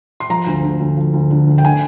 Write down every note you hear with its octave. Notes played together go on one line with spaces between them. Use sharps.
C6
F3 A#5
D2
D3
D2
F3
D2
D3
D2
G5
D3 G#5